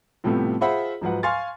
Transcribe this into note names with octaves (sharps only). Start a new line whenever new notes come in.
A2 C3 F3 G3 A3 B3
F4 G#4 C5 E5 F#5 B5
G#2 F3 F#3 B4 F#5
F5 G#5 C6 C#6 F6 A6